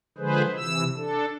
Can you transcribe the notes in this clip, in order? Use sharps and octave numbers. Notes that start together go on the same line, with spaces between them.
D3 F3 G#3 G#4 B4 C5
C3 E3 E6
D4 A4